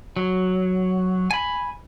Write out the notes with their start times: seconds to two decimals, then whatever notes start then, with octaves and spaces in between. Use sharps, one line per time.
0.16 F#3
1.31 G#5 B5